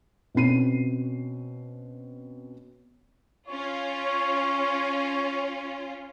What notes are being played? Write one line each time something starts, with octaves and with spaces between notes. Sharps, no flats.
B2 C4 C#4 C7 D#7
C#4 F4 C#5